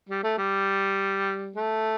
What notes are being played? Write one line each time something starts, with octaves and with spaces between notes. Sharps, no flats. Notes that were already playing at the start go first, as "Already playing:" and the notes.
G3
A3
G3
A3